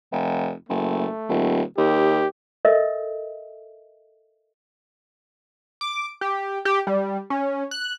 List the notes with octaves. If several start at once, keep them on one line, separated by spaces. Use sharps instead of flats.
F1
F#1 A3
D#1
D#2 G4
A4 A#4 D#5 E5
D6
G4
G4
G3
C#4
F#6